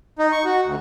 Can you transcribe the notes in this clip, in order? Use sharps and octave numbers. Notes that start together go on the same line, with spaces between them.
D#4
C#6
F#4
D2